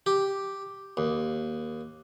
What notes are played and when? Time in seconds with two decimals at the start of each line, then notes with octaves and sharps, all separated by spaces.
0.06 G4
0.97 D#2